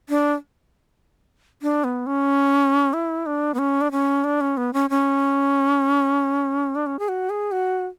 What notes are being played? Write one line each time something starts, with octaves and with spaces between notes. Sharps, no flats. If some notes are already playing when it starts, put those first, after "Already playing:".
D4
D4
B3
C#4
E4
D4
B3
C#4
D4
C#4
D4
C#4
B3
C#4
C#4
D4
C#4
G#4
F#4
G#4
F#4